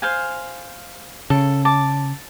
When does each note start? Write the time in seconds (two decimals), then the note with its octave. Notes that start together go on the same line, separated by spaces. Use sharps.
0.02 C5 F5 G#5
1.30 C#3 A4
1.65 A5 D6